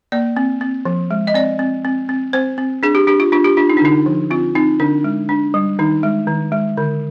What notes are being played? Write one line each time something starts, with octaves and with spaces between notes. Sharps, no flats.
A#3 D5
C4
C4
F3
G#3
D#5
C4 D5
C4
C4
C4
C4 C5
C4
D4 G#4
G4
D4 G4
F4
D4 F4
G4
D4 F4
D#4
D4
D3 D#4
F3
C4 F4
C4 D#4
D3 D4
G#3
D4
G3
D#3 D#4
G#3
D#3
G#3
D3